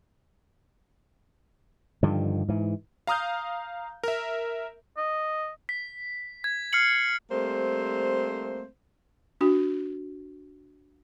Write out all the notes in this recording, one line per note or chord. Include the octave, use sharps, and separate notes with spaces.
G2 D3 D#3 F3
G#2 E3
F5 A#5 D#6 F6 G6
A#4 E5
D#5
B6
G#6
F6 C7 C#7 F#7
G3 A3 A#3 C4 C5
D4 F#4